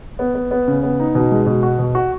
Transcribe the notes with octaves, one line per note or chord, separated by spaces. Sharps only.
B3
B3
B3
C#3
B3
D#4
B2
G#3
B2
F#4
B2
F#4